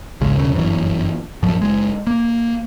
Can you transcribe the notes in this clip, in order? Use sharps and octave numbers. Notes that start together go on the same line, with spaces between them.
G#1 C#2 C#3 G#3
E1 C2 C#3
G1 F#2 E3 F#3
F#2 A2 F3 F#3
F#1 G#3
A#3